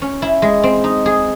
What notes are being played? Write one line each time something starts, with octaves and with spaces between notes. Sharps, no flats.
C#4
E4
G#3
C4
D#4
G#4